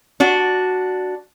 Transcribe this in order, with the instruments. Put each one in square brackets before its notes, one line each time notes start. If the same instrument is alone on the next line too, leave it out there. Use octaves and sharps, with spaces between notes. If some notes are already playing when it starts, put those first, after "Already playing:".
[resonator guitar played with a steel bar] D4 F#4